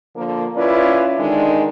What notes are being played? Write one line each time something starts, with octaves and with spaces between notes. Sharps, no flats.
D3 F3 A#3
C#4 E4 F4 B4 D5
D3 D#3 G#3 D4 D#4